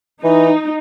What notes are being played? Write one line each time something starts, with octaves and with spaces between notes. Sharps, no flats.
E3 D#4